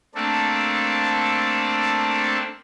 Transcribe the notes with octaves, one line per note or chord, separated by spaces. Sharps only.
A3 A#3 C4 D4 A4